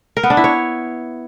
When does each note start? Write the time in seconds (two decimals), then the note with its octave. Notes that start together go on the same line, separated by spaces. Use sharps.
0.17 A#4
0.23 B3
0.30 D4
0.37 E4
0.44 C#5